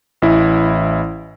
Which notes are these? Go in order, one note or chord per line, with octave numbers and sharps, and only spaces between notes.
A1 E4